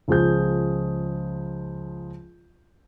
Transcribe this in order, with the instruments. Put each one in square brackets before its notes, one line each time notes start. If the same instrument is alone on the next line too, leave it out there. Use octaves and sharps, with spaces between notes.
[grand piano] C#2 F3 G#4 G6